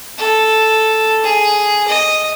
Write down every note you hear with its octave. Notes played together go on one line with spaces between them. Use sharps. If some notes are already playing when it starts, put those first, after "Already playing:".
A4
G#4
D#5